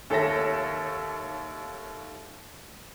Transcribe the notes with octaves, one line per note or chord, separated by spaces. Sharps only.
D#2 A4 C#5 E5 A#6